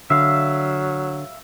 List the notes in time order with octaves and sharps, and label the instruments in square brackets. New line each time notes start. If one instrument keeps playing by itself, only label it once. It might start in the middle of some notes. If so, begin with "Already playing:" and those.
[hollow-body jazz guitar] D3 [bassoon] F#3 [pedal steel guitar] E5 F5